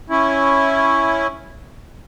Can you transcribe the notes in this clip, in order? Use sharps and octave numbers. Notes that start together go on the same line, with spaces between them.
C#4 E4